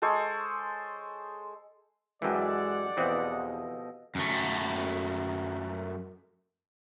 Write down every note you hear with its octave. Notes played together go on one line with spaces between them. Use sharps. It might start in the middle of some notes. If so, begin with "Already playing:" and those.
G#3 A4 C5 C#5
F#2 E3 G#3 G4 A4 D5 F#5 G#5
E2 B2 E3 F3 C4 D#5
F#2 A3